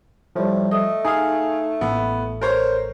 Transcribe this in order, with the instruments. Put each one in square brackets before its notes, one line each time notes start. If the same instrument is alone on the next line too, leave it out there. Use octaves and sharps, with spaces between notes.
[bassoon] A2 [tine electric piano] F3 G3
[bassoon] A3 [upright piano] D#5
[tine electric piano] D#4 [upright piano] G#4 F5
[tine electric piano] A1 A4 [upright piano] B3
[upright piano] A#4 C5 C#5